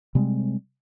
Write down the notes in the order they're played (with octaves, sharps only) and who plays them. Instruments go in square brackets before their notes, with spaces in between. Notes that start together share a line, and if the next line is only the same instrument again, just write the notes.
[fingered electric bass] C3 G3 G#3 C4